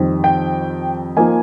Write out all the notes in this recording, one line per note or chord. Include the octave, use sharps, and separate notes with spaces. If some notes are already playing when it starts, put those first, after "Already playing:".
Already playing: F2 D#3 G3 C4
G5
F3 A#3 D#4 G#5